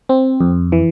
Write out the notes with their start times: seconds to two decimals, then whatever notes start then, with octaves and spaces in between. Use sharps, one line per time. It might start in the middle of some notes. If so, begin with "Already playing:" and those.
0.09 C4
0.41 F2
0.72 E3